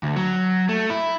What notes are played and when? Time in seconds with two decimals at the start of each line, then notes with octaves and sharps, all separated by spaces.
0.03 D2
0.16 F#3
0.69 A3
0.90 E4